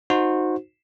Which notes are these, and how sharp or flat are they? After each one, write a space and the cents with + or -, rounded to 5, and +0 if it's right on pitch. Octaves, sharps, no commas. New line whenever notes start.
D#4 -5 F#4 -20 C5 +0